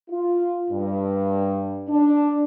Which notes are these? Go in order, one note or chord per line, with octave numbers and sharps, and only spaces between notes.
F4
G2
D4